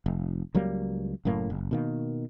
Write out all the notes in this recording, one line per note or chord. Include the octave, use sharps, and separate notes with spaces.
F1
C#2 F#3 G3 A#3
F#1 F#2 A2 A#3
F#1
B2 D#3 A#3